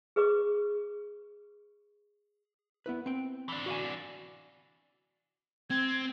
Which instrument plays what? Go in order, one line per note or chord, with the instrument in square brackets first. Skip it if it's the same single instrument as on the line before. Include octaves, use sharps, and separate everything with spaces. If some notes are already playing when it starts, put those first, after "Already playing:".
[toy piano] G#4 B4 D#5 C#6 D6
[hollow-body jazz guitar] B3 E4 B4
C4 G5
[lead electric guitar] E3 D4
[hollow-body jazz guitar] F#4 F5 G#5
[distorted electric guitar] C4 [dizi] G#6